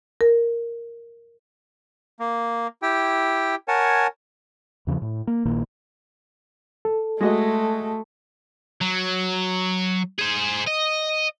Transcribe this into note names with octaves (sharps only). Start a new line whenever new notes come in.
A#4
A#3
E4 G4 G5
A#4 C#5 F#5 G#5 A5
E2 C#3 E3 F3
A2
A#3
A#1 A#2 D#3 A#3
A4
G#3 A3 F#4 D#5
F#3
G#4 C5
D#5